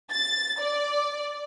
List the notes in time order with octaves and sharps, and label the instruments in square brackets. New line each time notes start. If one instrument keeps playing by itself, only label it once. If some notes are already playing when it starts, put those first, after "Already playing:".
[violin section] A6
D5